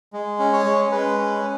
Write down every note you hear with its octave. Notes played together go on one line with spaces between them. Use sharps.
G#3
C#4
C#5
G#3
G#3 B4
C#4